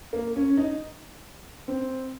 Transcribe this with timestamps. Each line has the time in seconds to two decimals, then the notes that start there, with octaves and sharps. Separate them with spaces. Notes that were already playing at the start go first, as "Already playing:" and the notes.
0.13 A#3
0.36 C#4
0.57 D#4
1.68 C4